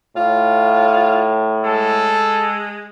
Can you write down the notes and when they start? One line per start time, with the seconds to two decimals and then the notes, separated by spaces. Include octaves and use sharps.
0.16 A2 F4
1.64 G#3 A4